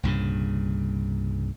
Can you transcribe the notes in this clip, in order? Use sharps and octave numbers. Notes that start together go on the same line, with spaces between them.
C2 G2 A#2 C#3